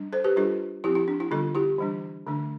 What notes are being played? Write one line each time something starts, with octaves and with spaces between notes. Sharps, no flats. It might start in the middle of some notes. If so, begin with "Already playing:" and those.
Already playing: G3 D4
A4 C5
G4 B4
G3 D4 F4 A4
F3 C4 E4 G4
E4
D4
E4
D3 G3 B3 D4 F4 A4
E4 G4
E3 G3 D4
D3 A3 D4